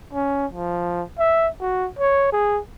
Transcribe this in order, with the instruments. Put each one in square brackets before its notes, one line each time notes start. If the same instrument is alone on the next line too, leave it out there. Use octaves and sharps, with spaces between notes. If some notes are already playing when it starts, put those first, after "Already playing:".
[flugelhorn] C#4
F3
E5
F#4
C#5
G#4